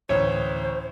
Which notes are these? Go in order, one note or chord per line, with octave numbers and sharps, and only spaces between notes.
A1 D2 C5 C#5